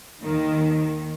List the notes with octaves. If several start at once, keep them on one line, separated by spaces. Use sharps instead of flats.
D#2 D#3